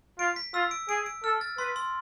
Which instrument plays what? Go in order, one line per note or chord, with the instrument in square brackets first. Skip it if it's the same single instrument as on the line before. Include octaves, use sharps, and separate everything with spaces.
[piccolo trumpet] F4 [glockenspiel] D7
[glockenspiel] B6
[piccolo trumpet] F4 [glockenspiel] E6
[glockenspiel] D7
[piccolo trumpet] G#4 [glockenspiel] D7
[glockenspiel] D7
[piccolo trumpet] A4 [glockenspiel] F6
[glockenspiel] A6
[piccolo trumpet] B4 [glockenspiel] C6
[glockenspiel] C6